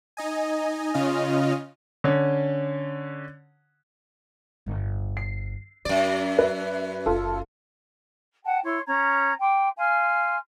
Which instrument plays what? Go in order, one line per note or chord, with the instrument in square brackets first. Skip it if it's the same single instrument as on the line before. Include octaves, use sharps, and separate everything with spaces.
[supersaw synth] D#4 D#5 G#5
C#3 C#4 F4 D#5 F6
[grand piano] D3 C#4
[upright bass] G1 A2
[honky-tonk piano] C7
[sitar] F#2 D5 [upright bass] F4
[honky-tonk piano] B4 E5
[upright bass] F#1 F#3 [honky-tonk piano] F4 A4
[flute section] F#5 G5 A5
E4 C#5 C6 C#6
C#4 A#5 G#6
G5 C6 D6
F5 G#5 C6 F6